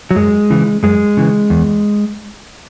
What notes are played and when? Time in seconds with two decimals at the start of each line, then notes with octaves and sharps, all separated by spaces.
0.11 F#3
0.16 F#2 G#3
0.50 C#3 E3
0.83 F#2 G#3
1.17 C#3 E3
1.50 E2